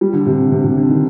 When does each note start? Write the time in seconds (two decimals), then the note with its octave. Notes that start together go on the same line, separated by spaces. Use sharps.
0.01 G3
0.13 D3
0.26 C3
0.52 C3
0.64 C3
0.77 D3
0.89 D#3